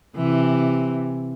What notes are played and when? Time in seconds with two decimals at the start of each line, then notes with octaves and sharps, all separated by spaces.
0.16 C3 E3